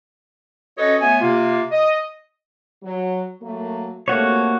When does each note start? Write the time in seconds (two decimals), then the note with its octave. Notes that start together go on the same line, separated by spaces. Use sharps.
0.78 C#4 F#4 A4 B4 C#5 D#5
1.01 A3 B3 C#5 E5 G#5
1.21 C3 A#3 F4
1.71 D#5
2.83 F#3
3.41 F#3 A3 A#3
4.08 D2 C3 A3 A#3 F#4 C#5